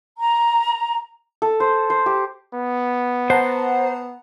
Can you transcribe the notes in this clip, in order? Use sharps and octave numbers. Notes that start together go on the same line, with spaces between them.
A#5
A4
C5
C5
G4
B3
C5 F#5 A5 A#5